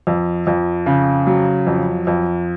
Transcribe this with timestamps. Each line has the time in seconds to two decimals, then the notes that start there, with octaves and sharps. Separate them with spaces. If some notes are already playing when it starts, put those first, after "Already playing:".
0.07 F2
0.47 F2
0.86 C#3
1.27 F#3
1.67 F2
2.07 F2